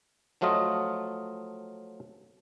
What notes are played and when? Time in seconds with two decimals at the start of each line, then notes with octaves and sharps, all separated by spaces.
0.41 F3 F#3 A3 F4 D#5